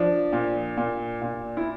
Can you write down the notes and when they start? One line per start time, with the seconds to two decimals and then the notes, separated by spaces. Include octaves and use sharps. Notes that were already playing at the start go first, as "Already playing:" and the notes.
Already playing: F3 D4
0.32 A#2
0.77 A#2
1.22 A#2
1.57 E4